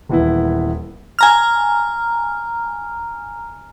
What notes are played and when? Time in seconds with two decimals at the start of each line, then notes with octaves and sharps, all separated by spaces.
0.09 D#1 E3 B3 E4
1.19 G#5 A#5 F6